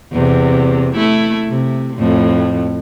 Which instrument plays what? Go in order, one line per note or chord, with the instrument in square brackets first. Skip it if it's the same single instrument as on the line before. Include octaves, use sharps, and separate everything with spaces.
[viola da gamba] E2 C3
A3 E4
C3
F2 A2